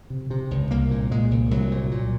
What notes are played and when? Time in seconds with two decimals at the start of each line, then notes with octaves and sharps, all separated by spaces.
0.10 C3
0.30 C3
0.51 C#2
0.71 C2 A#3
0.91 A#2
1.11 A#2 G#3
1.31 C2
1.51 C2 F#3
1.71 A#2
1.91 A#2